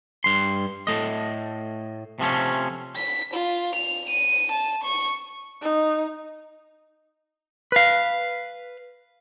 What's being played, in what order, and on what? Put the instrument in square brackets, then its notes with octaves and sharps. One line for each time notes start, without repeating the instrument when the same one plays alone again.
[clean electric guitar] G2 C6
A2 A3 D#5
C3 F3 A3 C#4
[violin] B6
F4
F7
D#7
A5
C#6
[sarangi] D#4
[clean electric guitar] B4 F5